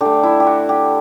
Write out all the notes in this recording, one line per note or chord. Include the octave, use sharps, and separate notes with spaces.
D3 A3 G4
E4
G4
F#4
G4